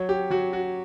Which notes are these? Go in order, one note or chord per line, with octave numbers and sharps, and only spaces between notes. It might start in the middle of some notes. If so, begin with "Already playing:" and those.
Already playing: F#3 C#5
G4
F#3 F#4
F#4